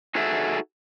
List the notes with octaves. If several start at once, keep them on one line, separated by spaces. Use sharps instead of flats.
D#4 F#4 G#4 A4 E5